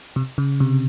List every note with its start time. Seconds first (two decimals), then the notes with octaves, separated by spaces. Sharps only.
0.16 C3
0.38 C#3
0.60 C3